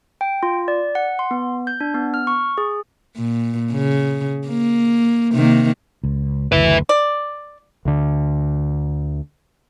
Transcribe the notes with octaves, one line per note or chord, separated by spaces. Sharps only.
G5
F4
D5
F#5
C6
B3
G6
D4
B3
F6
C#6
G#4
A#2
C#3
A#3
C3 D#3 A#3
C#2
F#1 D2 B4 E5
D5
D2 D3